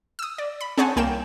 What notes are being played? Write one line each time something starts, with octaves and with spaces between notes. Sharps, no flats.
D#6 E6
D5
B5
C4 G#4 C#5 F#5 G#5 A5
C2 A#3 G5 E7